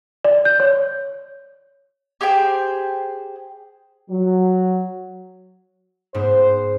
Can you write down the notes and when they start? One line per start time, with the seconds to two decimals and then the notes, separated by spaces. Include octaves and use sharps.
0.25 D5
0.45 G6
0.60 C#5
2.21 G4 G#4 C5 G5
4.10 F#3
6.14 G#2 B3 C5